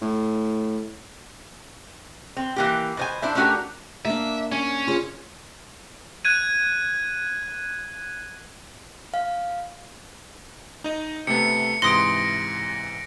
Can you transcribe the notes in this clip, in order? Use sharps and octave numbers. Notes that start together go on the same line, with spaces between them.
A2
C4
E3 A#3 G4
B2 C5 G#5
D4 E4 C5 E5
A3 C#4 D4 F#4 G4 A#4
A#3 D4 E5
C#4 G#5
F4 G#4 C#5
F#6 G#6 D#7
F5
D#4 D#5
C3 A3 B3 C#7
G#2 C3 E3 C6 D#6 A#6 D7